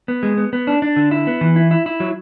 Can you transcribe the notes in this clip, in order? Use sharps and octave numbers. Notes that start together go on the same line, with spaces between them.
B3
G#3
B3
B3
D4
D4
D3
E4
B3
E3
E4
E4
E4
F#3